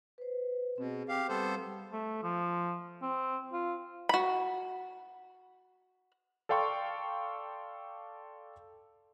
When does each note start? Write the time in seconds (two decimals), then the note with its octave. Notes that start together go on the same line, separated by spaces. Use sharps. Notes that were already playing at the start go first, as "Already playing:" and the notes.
0.18 B4 C5
0.78 B2 C4 G#4
1.09 G4 F5
1.29 G3 B3 G4 A4 C5
1.92 A3
2.23 F3
3.02 C4
3.53 F4
4.09 F#4 B5
6.49 A4 D5 F5 G5 C6 C#6